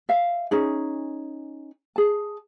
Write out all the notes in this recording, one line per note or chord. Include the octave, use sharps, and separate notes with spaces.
E5 F5
C#4 D#4 G#4
G#4 A5